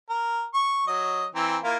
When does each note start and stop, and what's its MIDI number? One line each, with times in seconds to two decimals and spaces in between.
0.09 0.43 70
0.54 0.83 85
0.87 1.25 54
0.87 1.25 75
1.35 1.58 52
1.35 1.58 60
1.35 1.58 82
1.63 1.77 58
1.63 1.77 64
1.63 1.77 65